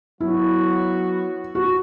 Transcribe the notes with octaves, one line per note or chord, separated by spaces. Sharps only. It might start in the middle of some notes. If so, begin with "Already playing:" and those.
F#3 B3 E4 F#4
F#4